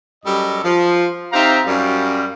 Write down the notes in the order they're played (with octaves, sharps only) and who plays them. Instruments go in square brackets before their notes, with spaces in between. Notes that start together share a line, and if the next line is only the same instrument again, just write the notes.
[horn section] F#2 G3 A4 D#5
F3
C4 D#4 G4 E5 F5 A#5
F#2 G3 F5